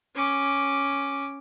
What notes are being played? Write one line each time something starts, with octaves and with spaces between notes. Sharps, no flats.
C#4 D6